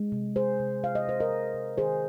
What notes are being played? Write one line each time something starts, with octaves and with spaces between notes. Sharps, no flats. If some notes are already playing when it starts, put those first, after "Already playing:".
Already playing: G#3
C3
G#3 G#4 C5
C3
G#3 F5
D#5
C3 C5
A#4 D#5
G#3
C3
D#3 G#4 C5